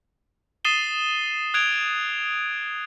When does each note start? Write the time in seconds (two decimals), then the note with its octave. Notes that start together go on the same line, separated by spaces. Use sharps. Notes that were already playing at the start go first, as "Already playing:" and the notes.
0.65 D#6 A6 C7 D#7 E7 G7
1.54 D#6 F#6 G#6 D7 F7